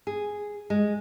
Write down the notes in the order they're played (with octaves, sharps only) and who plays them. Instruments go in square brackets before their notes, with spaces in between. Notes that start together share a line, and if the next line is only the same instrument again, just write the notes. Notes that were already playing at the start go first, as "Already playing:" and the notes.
[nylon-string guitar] G#4
G#3